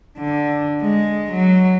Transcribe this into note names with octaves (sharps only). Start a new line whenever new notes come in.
D3
G#3
F#3